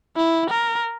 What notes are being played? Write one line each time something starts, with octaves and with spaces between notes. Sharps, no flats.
E4
A#4